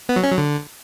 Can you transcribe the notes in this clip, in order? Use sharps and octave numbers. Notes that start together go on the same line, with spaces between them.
B3
F#3
C#4
F#3
D3